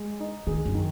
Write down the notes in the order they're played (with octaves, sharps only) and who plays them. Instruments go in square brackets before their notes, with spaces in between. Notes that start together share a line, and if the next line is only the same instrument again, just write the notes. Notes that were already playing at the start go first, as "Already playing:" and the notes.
Already playing: [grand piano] G#3
D#4
[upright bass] D#3 [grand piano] G#4
[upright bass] F#2
[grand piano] D#3